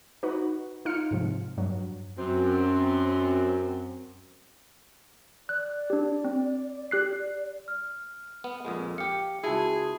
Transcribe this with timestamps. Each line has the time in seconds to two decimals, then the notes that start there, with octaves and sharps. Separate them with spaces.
0.23 D#4 F#4 B4
0.85 D#4 F4 F6 C#7
1.11 G#2 C3 F3
1.57 G2 F#3
2.18 F#2 C4
5.49 D5 F#6
5.90 D4 G4
6.25 C4
6.91 G4 F#6 C7
7.68 F6
8.44 B3
8.65 F2 A#2 G#3
8.98 G4 F5 C#7
9.44 C#2 E4 F#4 G#4 A5 G#6